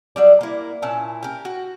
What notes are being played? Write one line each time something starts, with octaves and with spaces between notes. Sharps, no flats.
F#3 G3 D5
A#3 E4
A#2 C#4 E4 A5
G4 A#4
F#4